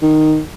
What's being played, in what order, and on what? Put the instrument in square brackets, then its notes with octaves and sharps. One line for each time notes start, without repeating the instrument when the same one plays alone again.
[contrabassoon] D#3